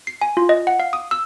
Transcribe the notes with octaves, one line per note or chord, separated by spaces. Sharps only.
C7
G#5
F4
D#5
F#5
F5
D#6
E6